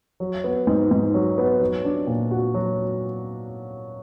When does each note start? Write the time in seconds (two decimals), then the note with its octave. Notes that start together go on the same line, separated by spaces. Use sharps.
0.20 F#3
0.44 B3
0.67 G#2
0.91 G#2
1.14 F#3
1.38 B3
1.60 F#3
1.85 D4
2.07 A#2
2.31 F#4
2.54 F#3